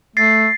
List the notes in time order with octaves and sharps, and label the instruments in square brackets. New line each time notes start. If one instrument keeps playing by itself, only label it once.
[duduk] A3 [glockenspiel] A6 C7